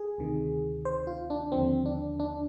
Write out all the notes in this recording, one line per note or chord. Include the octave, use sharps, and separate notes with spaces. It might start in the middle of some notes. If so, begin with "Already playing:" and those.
Already playing: G#4
D2 C3 D#3
C5
F4
D4
D#2 D3 F3 C4
D4
D4